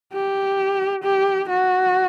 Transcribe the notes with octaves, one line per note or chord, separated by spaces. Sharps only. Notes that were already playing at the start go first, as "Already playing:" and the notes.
G4
G4
F#4